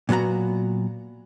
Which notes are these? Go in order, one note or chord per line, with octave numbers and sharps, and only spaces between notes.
A#2 F#3 B3 F#4 A#5